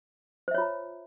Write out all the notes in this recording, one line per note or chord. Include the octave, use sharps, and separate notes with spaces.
F4 C5 C#5 E5 A#5